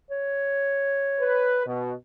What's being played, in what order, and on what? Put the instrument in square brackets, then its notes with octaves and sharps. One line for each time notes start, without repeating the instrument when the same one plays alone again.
[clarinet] C#5
[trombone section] B4
B2